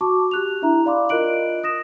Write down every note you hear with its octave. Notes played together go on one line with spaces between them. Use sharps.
F#4 A5 C#6 D6
G4 F#6 F7
D4 E4 E5 A#5
D5 F5 B5 C6 D6
F4 A#4 D#5 F#6 D7 F#7
D#6 A#6 E7